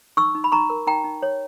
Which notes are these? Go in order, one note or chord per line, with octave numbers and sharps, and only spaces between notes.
D#4 C#6 E6
D#4
B5
D#4 A#5 C#6
A#4
D#4 G5 A#5
D#4
C#5